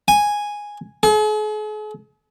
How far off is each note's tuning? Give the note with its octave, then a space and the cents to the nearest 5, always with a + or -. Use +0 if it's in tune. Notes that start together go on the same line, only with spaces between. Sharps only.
G#5 -5
G#4 +45